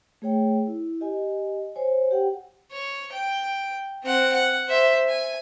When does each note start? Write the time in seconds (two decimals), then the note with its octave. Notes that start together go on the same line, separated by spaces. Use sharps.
0.22 A3 G#4 C#5 G5
0.67 E4
1.00 G4 D#5 G#5
1.75 C5 C#5 G#5
2.11 G4 F#5 G5
2.72 C#5
3.12 G5
4.04 C4 F#5
4.33 F#5
4.68 C5 E5
5.09 G#5